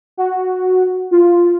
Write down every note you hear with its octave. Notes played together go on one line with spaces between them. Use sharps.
F#4
F4